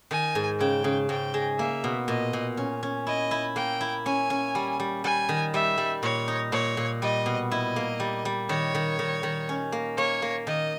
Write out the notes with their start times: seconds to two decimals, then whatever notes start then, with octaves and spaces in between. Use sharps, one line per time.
0.11 D#3 G#5
0.35 G#2
0.60 C#3 G5
0.84 C#3
1.09 G#2 G5
1.34 G#3
1.59 A#3 E5
1.84 B2
2.08 A#2 D#5
2.33 A#2
2.57 C#4
2.83 C#4
3.07 E4 D#5
3.31 E4
3.56 A#3 G5
3.81 E4
4.06 C#4 G#5
4.30 C#4
4.55 G3
4.80 G3
5.04 G3 G#5
5.29 D#3
5.54 G3 E5
5.78 G3
6.03 A#2 C#5
6.28 D#4
6.52 A#2 C#5
6.77 A#2
7.02 G3 D#5
7.26 B2
7.51 E4 D#5
7.76 A#3
8.00 G3
8.25 G3
8.49 D#3 C#5
8.75 D#3
8.99 D#3
9.23 D#3
9.49 C#4
9.72 A#3
9.97 A#3 C#5
10.22 A#3
10.47 D#3 D#5